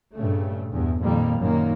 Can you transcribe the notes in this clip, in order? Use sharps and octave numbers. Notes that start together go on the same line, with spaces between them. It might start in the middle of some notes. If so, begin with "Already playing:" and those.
G2 A#2 C#3 A3
E2 G2
F2 A#2 D#3 G3 A#3
F#2 A#2 D#3 A#3